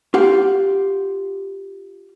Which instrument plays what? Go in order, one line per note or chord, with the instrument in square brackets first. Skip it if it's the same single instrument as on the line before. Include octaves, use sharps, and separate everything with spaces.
[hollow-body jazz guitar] F4 G4 F#5